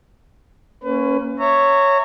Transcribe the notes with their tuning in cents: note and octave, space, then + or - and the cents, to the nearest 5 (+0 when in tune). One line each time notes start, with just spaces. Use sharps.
A#3 +0 C#4 +0 B4 +30
C#5 +0 E5 +0 A#5 -25